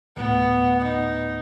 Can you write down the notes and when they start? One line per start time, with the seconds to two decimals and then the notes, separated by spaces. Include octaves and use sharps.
0.17 D2 A2 B3
0.83 D#4